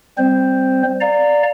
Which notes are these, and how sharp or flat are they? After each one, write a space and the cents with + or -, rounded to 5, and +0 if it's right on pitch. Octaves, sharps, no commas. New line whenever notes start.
G3 +0 C4 +0 C5 +0
D5 +0 F5 +15 A#5 -20